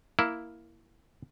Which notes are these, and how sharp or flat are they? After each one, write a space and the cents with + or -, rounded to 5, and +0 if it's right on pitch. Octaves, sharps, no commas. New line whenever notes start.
A#3 +0 E4 +0